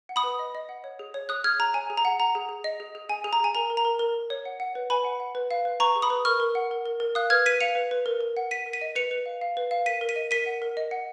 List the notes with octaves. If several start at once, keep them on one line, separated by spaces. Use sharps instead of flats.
F#5
B5 D#6
B4
D#5
D#5
F#5
C#5
G#4
C#5
G#4 D#6 F#6
G#4 F6 G#6
G#4 A#5
C#5 G#5
G#4
A#5
F#5
F#5 A#5
G#4
G#4
D#5
G#4
G#4
G#4 G#5
G#4
A#5
G#4 G#5
A#4 A#5
A#4
A#5
A#4
A#4
A#4
C#5
F#5
F#5
B4
B4 G#5 B5
F#5
F#5
B4
F5
B4
B4 A#5 C#6
G#4
B5 D#6
B4
A#4 C#6 F6
A#4
F#5
A#4
A#4
A#4
F5 D#6 F#6
B4 F6 G#6
B4 B6 D#7
F5 C#7 F7
B4
B4
A#4
A#4
F#5
F#5 B6 D#7
A#4
B6 D#7
D#5
B4 C#7 F7
B4
F5
F5
B4
F5
A#4 B6 D#7
A#4
B6 D#7
D#5
A#4 B6 D#7
F#5
A#4
D#5
F#5